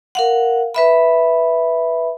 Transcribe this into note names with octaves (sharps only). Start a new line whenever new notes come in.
A#4 F5 F#5
B4 E5 B5